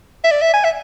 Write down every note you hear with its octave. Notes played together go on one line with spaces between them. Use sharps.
E5
D5
E5
G#5
E5